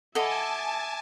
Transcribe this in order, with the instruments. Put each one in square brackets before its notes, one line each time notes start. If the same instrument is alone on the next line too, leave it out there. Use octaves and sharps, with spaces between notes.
[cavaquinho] A4 D#5 [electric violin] E5 D6 [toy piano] F#5 B5 [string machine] G#5 A5